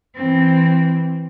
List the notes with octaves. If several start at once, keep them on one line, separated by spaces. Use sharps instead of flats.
E3 C4